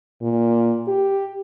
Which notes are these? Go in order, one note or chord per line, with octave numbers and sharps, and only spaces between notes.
A#2
G4